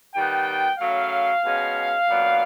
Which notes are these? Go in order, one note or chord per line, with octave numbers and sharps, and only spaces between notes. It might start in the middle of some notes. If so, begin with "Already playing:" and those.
D#3 G3 B3 G5
C#3 F#3 A3 F5
B2 G#3 C#4
A#2 F#3 B3 D4